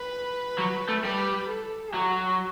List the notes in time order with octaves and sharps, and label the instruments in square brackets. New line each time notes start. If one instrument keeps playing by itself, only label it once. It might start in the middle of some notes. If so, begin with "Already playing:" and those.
Already playing: [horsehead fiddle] B4
[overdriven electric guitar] F#3
A3
[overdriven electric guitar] G3 [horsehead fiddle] B4
[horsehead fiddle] A4
[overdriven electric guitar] F#3 [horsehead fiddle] F#4